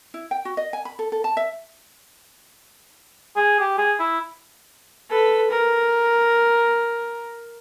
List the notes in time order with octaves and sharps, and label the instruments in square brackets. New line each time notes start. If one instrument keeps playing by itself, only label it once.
[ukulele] E4
G5
F#4
D#5
G#5
B5
A4
A4
A5
E5
[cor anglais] G#4
G4
G#4
E4
[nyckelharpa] A4 B4
A#4